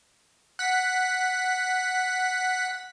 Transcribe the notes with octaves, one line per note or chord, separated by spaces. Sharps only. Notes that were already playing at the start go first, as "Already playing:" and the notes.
F#5 B6